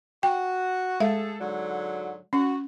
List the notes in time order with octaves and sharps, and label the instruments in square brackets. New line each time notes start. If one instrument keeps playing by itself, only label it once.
[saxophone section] F#4 [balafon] G5
[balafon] G#3 E5 F5 [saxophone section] A3 G#4 A4
[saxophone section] G#2 D3 F#3
[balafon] C#4 [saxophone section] F#4